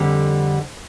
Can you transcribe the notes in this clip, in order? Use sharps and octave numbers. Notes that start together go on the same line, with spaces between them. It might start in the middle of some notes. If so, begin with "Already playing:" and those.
Already playing: F2 D3 G3